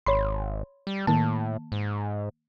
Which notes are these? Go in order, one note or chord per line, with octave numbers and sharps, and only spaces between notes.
G#1 C#5 B5 C6
G3
A2 D#3 A#3 A5
G#2